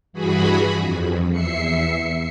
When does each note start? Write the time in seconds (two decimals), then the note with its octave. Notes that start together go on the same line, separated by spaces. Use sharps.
0.13 G2 E3 F#4 G#4 B5
0.76 F2
1.31 E2 E5 C7 C#7